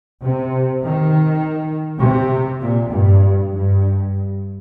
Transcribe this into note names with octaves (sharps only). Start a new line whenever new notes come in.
C3
D#3
C3
A#2
G2
G2